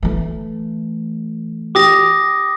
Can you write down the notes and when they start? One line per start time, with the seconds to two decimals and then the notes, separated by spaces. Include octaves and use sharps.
0.03 E3 A3
1.75 G4 D6 D#6 A#6